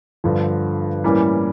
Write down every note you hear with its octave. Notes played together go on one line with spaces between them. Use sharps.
G2 D3 F3
A2 E3 G3 A#3 C#4